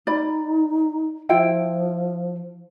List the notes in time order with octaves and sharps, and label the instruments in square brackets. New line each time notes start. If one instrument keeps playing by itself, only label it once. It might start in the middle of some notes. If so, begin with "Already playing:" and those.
[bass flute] D#4 [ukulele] D5 B5
[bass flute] F3 [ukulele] E4 F4 G5